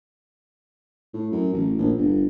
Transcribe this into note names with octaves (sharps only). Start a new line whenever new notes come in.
A2
F#2
A1
A#1
G1